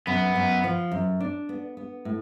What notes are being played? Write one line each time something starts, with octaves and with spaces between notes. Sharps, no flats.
F#2 B3
F#2
F3
F#2
D4
B3
B3
A2